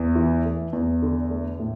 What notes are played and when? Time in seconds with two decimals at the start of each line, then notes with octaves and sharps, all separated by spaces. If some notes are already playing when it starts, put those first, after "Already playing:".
Already playing: E2
0.16 E3
0.45 A3
0.73 E2
1.02 D3
1.30 A3
1.59 A2